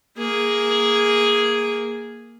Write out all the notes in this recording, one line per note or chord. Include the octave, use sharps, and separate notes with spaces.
A#3 G#4